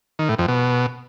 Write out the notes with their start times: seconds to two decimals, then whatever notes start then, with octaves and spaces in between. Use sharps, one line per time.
0.19 D#3
0.29 A2
0.39 F2
0.48 B2